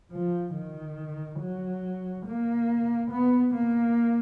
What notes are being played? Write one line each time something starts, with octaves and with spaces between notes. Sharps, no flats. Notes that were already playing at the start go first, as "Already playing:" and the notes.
F3
D#3
F#3
A#3
B3
A#3